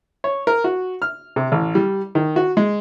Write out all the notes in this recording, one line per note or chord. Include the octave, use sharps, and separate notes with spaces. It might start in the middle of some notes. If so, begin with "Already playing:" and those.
C#5
A#4
F#4
F6
C3
A1
G3
D#3
F#4
G#3